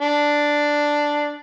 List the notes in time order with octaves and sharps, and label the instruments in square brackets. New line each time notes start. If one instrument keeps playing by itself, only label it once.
[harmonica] D4